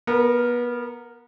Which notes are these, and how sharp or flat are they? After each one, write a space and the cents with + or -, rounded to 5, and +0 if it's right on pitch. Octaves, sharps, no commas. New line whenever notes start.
B3 -30 A#4 +0